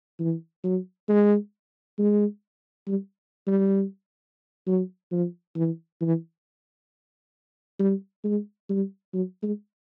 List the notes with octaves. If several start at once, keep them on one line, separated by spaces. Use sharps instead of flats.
E3
F#3
G#3
G#3
G3
G3
F#3
F3
E3
E3
G3
G#3
G3
F#3
G#3